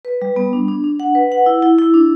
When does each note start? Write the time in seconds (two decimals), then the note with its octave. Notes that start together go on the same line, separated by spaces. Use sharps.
0.05 B4
0.22 G3
0.36 B3
0.53 D4
0.68 D4
0.84 D4
1.00 F#5
1.15 B4
1.32 F#5
1.46 E4
1.62 E4
1.78 E4
1.94 D4